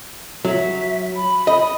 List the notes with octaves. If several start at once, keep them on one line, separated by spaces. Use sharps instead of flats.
F#3 E5
B5
D#5